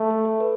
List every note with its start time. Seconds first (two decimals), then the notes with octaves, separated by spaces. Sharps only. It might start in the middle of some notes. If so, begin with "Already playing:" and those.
Already playing: A3
0.10 A4
0.25 A4
0.40 B4